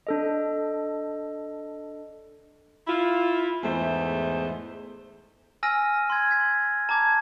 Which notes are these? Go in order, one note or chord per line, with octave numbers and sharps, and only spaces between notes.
D4 A4 D#5
E4 F4
E2 G#2 A3 C5
G#5 E6 F6 A#6 D#7
C6 G#6
G#6 B6
A5 A#5 D6 G#6